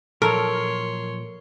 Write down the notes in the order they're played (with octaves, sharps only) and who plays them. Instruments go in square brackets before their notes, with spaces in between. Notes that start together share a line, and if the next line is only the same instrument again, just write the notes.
[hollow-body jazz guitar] A#2 F3 F#3 [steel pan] A4 [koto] A#4 [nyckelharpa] C#5 C6